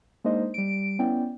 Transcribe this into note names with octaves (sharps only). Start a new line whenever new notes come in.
G#3 A#3 D4 D#4 C5 D#5
G3 D7
B3 C#4 E4 D5 G5